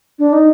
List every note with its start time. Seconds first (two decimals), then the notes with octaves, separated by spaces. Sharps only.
0.19 D4
0.33 D#4